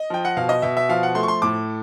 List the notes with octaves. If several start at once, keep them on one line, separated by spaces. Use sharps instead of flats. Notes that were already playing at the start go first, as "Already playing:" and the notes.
Already playing: D#5
F3 G5
F#5
B2 F5
D#5
B2 E5
E5
F3 F5
F#5
A3 C6
C#6
C6
A2 D6